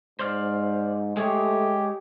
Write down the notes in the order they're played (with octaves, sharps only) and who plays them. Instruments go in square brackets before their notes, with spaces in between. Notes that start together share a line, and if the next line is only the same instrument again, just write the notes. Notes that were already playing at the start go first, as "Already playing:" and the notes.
[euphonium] G#2 [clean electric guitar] C5 D5 F5
[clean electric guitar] G#3 G#4 C#5 [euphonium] A3 [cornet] G4